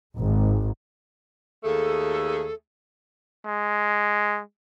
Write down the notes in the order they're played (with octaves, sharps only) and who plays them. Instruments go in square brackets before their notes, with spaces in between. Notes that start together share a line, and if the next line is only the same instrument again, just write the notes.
[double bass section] G#1
[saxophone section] D#2 A3 G#4 [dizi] A4
[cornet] G#3